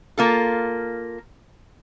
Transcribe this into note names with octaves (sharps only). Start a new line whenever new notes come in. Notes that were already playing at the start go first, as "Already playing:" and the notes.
A#3 F4 A4